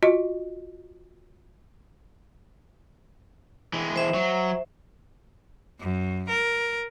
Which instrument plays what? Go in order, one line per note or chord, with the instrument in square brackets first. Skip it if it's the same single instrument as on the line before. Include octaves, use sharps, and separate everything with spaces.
[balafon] F4 F#4 D#5
[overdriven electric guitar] E3 G#3
[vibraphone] C5 E5
[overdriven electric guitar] F#3
[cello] F#2
A#4